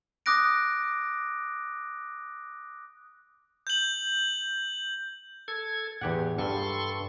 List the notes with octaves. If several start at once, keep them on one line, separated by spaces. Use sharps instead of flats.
D6 D#6 F#6 A#6 D7
G6 F#7
A4 G#6
E2 A2 G4 F#5
G2 A4 C6 C#6